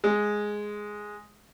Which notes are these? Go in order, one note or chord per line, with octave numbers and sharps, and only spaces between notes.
G#3